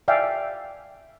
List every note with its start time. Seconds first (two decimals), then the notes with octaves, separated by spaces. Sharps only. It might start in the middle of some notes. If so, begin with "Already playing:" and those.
0.08 D5 E5 F5 G5 G#5